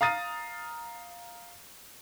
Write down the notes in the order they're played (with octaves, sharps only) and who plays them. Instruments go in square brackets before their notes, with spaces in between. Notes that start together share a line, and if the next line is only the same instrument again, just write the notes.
[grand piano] F5 A#5 D#6 A6 D#7